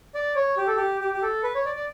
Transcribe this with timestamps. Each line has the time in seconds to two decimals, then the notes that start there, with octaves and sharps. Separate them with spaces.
0.15 D5
0.35 C#5
0.57 G4
0.67 A4
0.77 G4
1.01 G4
1.13 G4
1.22 A4
1.43 B4
1.55 C#5
1.65 D5
1.76 D5